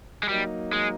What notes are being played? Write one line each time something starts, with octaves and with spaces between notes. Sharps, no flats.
G#3
F#3 G3 A#3 D#4
G#3